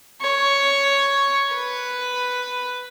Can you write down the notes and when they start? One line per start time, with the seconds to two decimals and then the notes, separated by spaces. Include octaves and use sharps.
0.22 C#5
1.52 B4